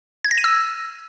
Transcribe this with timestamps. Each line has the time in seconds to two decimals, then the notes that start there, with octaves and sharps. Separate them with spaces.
0.24 G#6
0.31 A#6
0.38 D#7
0.44 E6